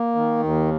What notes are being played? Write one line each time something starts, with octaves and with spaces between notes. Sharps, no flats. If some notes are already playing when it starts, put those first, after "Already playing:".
Already playing: A#3
D#3
D#2